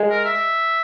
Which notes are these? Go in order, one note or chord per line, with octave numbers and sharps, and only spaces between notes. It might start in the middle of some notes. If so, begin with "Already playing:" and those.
Already playing: G#3
A#4
E5